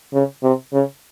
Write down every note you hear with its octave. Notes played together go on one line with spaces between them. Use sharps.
C#3
C3
C#3